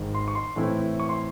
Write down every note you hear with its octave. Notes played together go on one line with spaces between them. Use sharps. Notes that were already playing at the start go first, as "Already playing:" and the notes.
Already playing: G#1 G#2 D#3
C6
C#6
C6
A2 E3 A3 C4 E4
C#6
C6